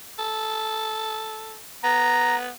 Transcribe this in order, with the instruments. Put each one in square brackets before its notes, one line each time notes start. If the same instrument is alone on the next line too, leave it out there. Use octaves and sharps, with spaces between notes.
[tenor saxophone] A4
[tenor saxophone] B3 [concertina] A#5